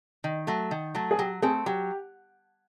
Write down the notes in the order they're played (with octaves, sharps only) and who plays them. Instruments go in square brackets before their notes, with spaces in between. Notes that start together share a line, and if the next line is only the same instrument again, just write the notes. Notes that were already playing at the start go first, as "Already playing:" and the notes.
[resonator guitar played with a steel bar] D#3
F#3 A3
D#3
F#3 A3
[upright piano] G#4
[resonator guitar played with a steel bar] F#3 [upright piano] G4
[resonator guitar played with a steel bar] A3 C4 [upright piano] G#4
[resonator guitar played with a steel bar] F#3 [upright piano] G4